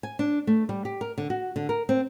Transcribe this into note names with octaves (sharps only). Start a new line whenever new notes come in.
G#5
D4
A3
G3
G4
A#4
D3
F#4
D3
A#4
C4